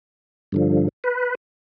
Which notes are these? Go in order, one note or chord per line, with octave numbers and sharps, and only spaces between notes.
G2 D3 F3
B4